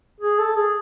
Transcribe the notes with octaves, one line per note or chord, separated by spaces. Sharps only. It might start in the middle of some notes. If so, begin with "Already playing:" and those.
G#4
A4
G#4